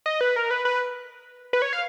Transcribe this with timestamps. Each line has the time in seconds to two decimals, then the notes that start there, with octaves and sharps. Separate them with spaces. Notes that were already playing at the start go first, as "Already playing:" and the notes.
0.06 D#5
0.21 B4
0.36 A#4
0.51 B4
0.65 B4
1.53 B4
1.62 C#5
1.73 F5